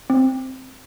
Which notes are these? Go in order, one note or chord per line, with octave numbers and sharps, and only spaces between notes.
C4